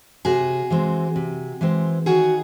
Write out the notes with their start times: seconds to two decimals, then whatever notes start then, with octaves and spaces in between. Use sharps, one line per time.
0.25 C3 F#4 G#4
0.70 E3 G#3 C4
1.16 C3
1.61 E3 G#3 C4
2.06 D#3 F#4 G#4